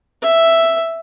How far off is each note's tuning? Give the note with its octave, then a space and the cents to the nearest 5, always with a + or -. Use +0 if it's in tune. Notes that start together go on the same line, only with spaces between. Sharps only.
E5 +5